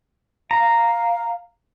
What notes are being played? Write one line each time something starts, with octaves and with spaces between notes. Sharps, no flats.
F5 A#5